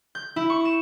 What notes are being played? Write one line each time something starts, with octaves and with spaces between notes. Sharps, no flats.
G6
E4
C#6
E7